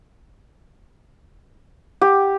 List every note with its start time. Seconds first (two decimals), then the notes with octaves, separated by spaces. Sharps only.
2.01 G4